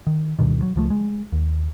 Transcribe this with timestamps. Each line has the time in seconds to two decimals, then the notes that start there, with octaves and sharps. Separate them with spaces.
0.07 D#3
0.39 D2 G2 B2 D#3
0.62 F#3
0.76 C#2 F3 A3
0.90 G#3
1.32 D#2